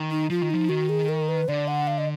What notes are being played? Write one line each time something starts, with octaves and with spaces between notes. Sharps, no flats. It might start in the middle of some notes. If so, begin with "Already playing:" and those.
Already playing: D#3
D#4
F3 F4
D#3
F3 D#4
D#3 F#4
G#4
A#4
B4
D3 D5
F#5
F5
D#5